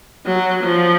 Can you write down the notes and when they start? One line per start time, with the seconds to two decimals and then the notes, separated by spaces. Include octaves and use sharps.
0.26 F#3
0.63 F3